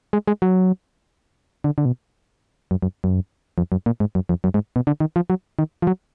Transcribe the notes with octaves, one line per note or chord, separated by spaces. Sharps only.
G#3
G#3
F#3
D3
D3
B2
F#2
F#2
F#2
F2
F#2
A#2
G#2
F#2
F2
F#2
G#2
B2
D3
D#3
F3
F#3
D#3
F3
F#3